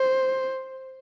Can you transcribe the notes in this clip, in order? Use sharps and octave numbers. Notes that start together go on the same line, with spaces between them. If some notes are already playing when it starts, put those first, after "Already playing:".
Already playing: C5